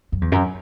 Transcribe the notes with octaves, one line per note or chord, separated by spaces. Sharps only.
F#2
E2
F#2